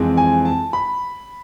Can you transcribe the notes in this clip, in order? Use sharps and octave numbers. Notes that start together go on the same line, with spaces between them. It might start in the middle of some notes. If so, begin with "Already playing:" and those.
Already playing: F2 E3 G#3 C4
G#5
A5
B5